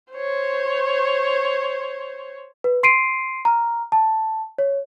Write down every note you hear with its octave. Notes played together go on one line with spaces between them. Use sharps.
C5 C#5
B4
C6 C7 D7 D#7
A#5 F6
A5
C#5